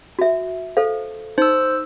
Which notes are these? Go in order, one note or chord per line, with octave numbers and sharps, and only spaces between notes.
F#4 E5
A4 C5 F5
D#4 C5 E6